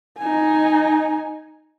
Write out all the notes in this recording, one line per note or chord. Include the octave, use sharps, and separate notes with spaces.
D#4 G#5